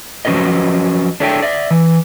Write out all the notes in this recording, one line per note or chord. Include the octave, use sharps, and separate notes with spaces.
F3 F#3 C#4 A#4 B4 D#5
D4 A4 C#5 E5 F5 G5
D5 E5
E3